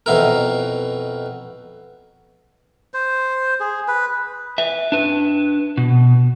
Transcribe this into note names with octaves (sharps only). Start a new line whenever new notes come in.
F2 B2 E4 A#4
C5
G#4
B4
B4 E5
D4 B4
B2